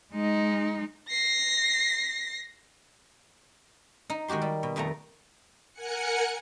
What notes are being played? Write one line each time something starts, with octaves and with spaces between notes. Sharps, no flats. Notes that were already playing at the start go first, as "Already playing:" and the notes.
G#3 D#4
A#6 C7
D#4
D#3 G#3 F#4 G4 C6
G3
B2
F2 D#3 A3 F4 A#5
A#4 F#5 G#5 F#6 C#7